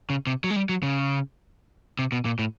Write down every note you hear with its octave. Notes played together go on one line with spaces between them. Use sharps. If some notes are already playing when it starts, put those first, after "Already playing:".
C#3
C3
F#3
G#3
G3
F#3
C#3
C3
B2
A#2
A2